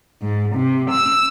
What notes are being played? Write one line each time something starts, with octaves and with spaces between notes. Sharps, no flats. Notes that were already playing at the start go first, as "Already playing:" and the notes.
G#2
C3
E6